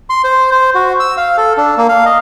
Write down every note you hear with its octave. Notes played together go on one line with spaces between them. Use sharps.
C6
C5
C5
F#4
E6
F5
A4
D4
A#3
F5
D#5